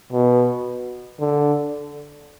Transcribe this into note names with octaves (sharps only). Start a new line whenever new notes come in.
B2
D3